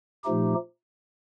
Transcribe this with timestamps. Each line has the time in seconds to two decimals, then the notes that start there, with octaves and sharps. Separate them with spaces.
0.24 A#2 F3 A3 D#4 G4